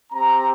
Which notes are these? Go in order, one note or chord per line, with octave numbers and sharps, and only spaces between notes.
C4 G4 A#5